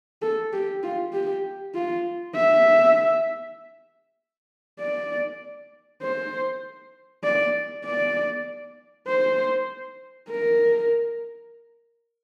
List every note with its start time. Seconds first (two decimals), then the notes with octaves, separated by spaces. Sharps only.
0.22 A4
0.53 G4
0.83 F4
1.13 G4
1.74 F4
2.36 E5
4.80 D5
6.02 C5
7.24 D5
7.85 D5
9.08 C5
10.30 A#4